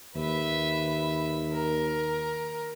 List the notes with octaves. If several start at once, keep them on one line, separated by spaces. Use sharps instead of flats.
D#2 B4 E5
A#4